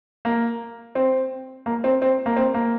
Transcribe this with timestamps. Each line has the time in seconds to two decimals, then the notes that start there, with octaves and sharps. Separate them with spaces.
0.25 A#3
0.95 C4
1.66 A#3
1.84 C4
2.02 C4
2.26 A#3
2.36 C4
2.54 A#3